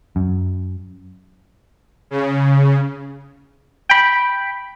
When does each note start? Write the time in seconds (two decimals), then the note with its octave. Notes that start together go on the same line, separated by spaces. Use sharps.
0.16 F#2
2.11 C#3
3.90 G5 B5